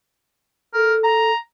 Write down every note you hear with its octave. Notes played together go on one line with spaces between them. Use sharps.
A4 A#4
A#5